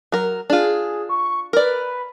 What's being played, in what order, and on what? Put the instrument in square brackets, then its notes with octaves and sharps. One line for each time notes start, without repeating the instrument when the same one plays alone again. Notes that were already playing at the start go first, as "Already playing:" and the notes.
[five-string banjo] F#3 A#4
[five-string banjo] D4 F4 [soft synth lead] G#4
[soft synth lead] C#6
[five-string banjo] A#4 D5 [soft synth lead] B4